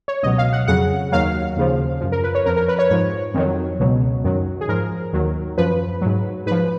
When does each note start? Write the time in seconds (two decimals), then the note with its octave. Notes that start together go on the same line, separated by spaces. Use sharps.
0.08 C#5
0.23 C#2 B2 F#3 D#5
0.38 F5
0.53 F#5
0.68 F2 C#3 F#3 F#5
1.12 D#2 D#3 F#3 F5
1.56 D#2 C#3 F3
2.01 F#2 F3
2.12 A#4
2.24 B4
2.35 C#5
2.46 F2 F3 A#4
2.57 A#4
2.68 B4
2.79 C#5
2.90 G#2 F3 C#5
3.34 F2 D#3 F#3
3.80 C#2 B2 F#3
4.24 F#2 D#3 F#3
4.61 G#4
4.68 G#2 F3 A#4
5.13 D#2 D#3 F#3
5.58 F#2 F3 B4
6.01 G#2 F#3
6.47 G#2 F3 B4